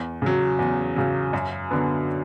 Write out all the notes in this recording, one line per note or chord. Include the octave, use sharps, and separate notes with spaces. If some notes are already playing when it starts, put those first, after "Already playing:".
Already playing: E2
C#3 F#3
E2
C#3 F#3
F#2
D3 F#3 B3